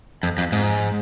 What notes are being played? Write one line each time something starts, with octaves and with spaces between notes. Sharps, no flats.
F2
F2
G#2